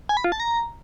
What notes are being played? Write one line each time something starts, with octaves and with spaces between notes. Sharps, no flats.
G#5
B5
F4
A5
A#5